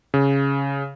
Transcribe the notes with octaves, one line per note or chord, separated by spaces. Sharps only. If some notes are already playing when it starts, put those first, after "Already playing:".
C#3